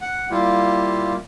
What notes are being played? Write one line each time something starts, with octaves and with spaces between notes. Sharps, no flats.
F#5
G3 A#3 E4 F4 G4